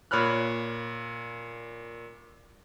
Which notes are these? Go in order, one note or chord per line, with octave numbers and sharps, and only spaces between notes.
A#2 C#5 B5 F6 F#6